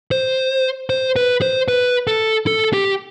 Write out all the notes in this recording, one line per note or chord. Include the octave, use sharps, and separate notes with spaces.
C5
C5
B4
C5
B4
A4
A4
G4